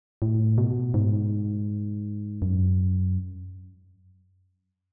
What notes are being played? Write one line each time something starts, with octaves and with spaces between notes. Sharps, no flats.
A2
B2
G#2
F#2